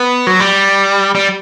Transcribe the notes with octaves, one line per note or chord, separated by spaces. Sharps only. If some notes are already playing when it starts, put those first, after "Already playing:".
Already playing: B3
F#3
G3
G3